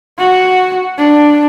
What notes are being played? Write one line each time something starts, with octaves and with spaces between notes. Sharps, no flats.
F#4
D4